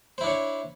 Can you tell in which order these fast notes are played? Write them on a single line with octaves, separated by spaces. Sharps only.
C5 E4 D4 C#5